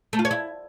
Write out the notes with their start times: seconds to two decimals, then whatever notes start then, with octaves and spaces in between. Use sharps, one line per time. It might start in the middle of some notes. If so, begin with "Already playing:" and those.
0.13 A3
0.19 F4
0.25 C#5
0.31 E4